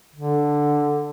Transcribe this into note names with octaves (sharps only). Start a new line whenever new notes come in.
D3